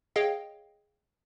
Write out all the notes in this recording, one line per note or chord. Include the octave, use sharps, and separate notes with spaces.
G#4 C#5 D#5 F5 G5